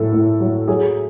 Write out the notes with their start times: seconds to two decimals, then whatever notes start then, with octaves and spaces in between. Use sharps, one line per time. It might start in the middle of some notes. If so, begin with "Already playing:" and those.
Already playing: A2 F#3 A4
0.13 A2
0.40 F#3
0.68 F#3 G#4